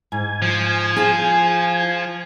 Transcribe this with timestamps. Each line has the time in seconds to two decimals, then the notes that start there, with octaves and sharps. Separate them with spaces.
0.12 G#2 G#5
0.42 F3
0.96 F4 G#4